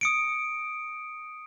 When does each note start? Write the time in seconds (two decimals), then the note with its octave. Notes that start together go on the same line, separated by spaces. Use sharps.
0.01 D#6 C#7 D7